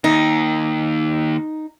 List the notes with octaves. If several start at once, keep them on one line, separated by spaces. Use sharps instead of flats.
D#2 D#4